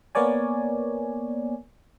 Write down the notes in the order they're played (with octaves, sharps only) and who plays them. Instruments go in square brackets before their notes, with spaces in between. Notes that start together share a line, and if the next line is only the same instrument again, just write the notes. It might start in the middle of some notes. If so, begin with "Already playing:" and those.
[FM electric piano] A#3 B3 A#4 C#5 D5 G#5